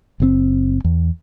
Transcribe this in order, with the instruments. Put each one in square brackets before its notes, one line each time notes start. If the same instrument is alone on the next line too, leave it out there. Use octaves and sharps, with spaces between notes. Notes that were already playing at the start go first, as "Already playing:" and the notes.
[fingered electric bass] F#1 B2 C4
E2